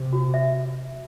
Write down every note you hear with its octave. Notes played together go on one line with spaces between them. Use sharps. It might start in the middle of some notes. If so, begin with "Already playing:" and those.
Already playing: C3
F#4
E5